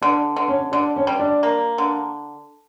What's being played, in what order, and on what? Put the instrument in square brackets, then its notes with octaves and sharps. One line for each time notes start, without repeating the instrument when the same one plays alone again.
[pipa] D3 [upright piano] D4
[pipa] D3
[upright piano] C#4
[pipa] D3 [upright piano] D4
[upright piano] C#4
[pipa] G3
[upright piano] D4
[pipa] A#3
D3